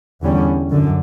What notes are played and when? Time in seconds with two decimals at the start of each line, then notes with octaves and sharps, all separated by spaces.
0.22 E2 D3 G3 C#4
0.71 F#2 D3